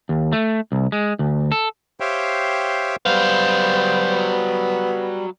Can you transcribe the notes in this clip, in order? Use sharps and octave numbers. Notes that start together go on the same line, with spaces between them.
D#2
A3
C2
G#3
D2
A4
G4 C5 C#5 E5 F5 G5
F#3 G3 B3 C5 F5